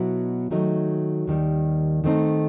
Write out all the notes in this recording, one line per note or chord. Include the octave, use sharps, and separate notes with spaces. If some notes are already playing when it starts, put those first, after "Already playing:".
Already playing: B2 F#3 B3 E4
D#3 F#3 A3 D#4
D#2 D#3 G3
D#3 A3 C4 D#4